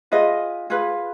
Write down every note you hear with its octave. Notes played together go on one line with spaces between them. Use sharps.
F4 G#4 B4 D#5
F4 G#4 B4